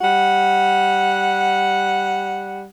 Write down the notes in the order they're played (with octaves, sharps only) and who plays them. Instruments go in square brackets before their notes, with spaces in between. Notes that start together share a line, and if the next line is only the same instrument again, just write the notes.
[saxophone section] G3 F#5